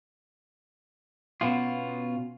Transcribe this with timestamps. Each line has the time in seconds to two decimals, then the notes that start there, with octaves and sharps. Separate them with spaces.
1.41 B2 B3 C#4 F4